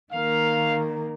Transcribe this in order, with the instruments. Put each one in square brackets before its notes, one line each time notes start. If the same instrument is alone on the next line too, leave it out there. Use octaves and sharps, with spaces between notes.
[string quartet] D#3 A#3 [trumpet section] F5